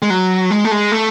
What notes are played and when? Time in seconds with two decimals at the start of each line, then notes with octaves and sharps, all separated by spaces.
0.02 G#3
0.10 F#3
0.51 G#3
0.65 A3
0.71 G#3
0.92 A3